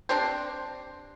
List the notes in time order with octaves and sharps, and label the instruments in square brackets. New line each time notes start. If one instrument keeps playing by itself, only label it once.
[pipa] C4 D4 G4 C5